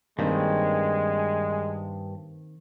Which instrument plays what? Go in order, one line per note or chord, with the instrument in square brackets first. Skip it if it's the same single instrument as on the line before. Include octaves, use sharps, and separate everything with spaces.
[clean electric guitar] G2 [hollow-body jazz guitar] D#3 A#3 C4 [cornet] G#3